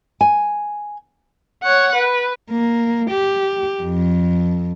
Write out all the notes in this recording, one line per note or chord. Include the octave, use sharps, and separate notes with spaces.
G#5
C#5 F#5
B4
A#3
G4
F2